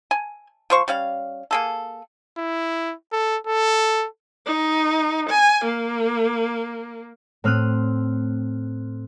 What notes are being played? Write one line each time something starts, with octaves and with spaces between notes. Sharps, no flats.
G#5
F3 C5 C#6
G3 C#4 F5
A#3 G#4 A4
E4
A4
A4
D#4
G#5
A#3
A2 C4 F6 F#6 D#7